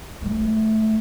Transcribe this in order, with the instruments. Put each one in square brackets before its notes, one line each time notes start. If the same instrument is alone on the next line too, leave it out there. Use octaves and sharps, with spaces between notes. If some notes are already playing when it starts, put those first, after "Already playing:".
[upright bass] G#3 A3